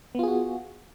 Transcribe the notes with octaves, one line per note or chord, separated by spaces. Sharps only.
B3 F4 F#4 G#4